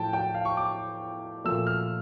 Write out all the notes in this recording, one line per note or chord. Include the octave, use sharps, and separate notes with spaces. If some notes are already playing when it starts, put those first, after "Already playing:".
Already playing: A2 F3 A3 G5 A5
G5
F5
C#6
D6
A#2 F3 A3 E6
F6